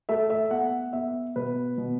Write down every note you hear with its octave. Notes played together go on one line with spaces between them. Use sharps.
A3 E5
E5
B3 F#5
B3 E5
B2 B4
B2